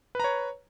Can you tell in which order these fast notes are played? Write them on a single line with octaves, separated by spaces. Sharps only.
B4 A#5 C#5